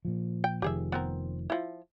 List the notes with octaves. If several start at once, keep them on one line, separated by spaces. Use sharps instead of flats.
A#2 F3
G5
F1 D#3 F3 G4 G#4 E5
B3 C4 A#4
F3 E4